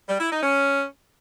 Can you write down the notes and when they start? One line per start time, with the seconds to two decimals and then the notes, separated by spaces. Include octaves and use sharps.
0.08 G3
0.20 E4
0.31 D#4
0.43 C#4